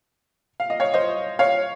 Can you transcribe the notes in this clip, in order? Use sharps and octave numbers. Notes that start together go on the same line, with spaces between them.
F5
D#5
C#5 F5
C5 D#5
C#5 F5